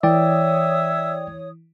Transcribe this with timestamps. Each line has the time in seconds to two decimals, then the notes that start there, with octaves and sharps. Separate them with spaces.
0.03 E3 C#5 D5 E5 G5 D#6